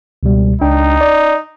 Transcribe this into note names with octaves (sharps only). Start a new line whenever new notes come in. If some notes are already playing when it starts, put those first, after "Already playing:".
C#2 B2 G3
C#2 D4 D#4 G5
D5